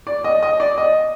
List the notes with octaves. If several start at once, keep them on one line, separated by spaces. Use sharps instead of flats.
D5
D#5
D#5
D5
D#5